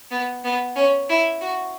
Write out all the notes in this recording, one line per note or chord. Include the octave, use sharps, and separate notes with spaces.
B3
B3
C#4
E4
F#4